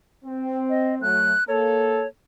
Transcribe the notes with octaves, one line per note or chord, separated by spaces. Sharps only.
C4
D#5
F#3 A3 F#6
A#3 A4 C#5